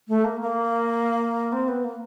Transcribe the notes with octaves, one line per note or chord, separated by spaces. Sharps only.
A3
A#3
A#3
C4
B3
A#3